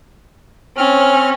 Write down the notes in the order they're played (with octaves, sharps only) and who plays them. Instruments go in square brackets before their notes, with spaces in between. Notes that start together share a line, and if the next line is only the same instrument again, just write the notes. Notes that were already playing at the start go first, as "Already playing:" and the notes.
[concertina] C4 F6 [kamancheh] C#4